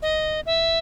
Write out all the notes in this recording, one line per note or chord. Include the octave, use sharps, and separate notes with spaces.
D#5
E5